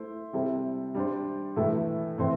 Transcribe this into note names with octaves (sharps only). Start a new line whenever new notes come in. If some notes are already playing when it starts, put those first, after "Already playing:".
Already playing: A3 E4 C5
C3 G3 E4 A4 C5
G3 D4 C5
A2 E3 A3 E4 A4
A2 E3 C4 A4 C5